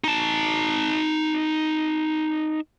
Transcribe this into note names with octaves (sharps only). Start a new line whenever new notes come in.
D#4 A5